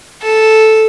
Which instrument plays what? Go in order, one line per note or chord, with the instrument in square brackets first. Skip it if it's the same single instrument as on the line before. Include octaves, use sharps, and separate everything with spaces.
[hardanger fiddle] A4